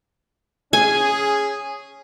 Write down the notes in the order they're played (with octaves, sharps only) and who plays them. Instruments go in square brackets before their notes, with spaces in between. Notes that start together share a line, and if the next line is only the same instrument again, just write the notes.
[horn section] C#4 G#4 [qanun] G#5